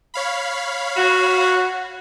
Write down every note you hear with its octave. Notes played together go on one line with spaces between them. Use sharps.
C#5 F5 B5
F#4